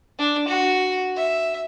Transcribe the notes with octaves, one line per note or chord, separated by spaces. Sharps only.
D4
F#4
E5